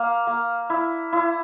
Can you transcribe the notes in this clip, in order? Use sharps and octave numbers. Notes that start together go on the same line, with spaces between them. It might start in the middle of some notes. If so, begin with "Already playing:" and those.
Already playing: A#3 F5
A#3
E4
E4